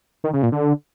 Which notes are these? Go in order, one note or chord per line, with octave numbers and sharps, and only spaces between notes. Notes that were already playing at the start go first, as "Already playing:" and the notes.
D#3
C#3
A#2
D3